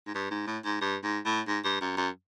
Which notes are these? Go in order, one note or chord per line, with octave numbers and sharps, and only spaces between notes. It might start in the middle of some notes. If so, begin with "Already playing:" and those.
G#2
G2
G#2
A2
G#2
G2
G#2
A2
G#2
G2
F#2
F#2